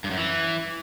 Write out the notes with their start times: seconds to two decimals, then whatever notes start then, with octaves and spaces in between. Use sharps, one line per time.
0.04 G2
0.11 F#2
0.17 E3